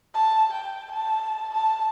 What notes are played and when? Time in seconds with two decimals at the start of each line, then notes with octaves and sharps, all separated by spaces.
0.14 A5
0.53 G5
0.91 A5
1.54 A5